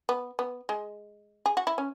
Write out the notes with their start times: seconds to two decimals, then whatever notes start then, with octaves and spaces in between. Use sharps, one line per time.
0.09 B3
0.39 B3
0.69 G#3
1.46 G#4
1.57 F#4
1.67 E4
1.78 C#4